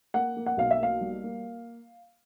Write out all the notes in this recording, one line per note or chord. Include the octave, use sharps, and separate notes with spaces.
A#3 F#5
A#3
F#5
B1 F5
E5
A#3 F5
G3
A#3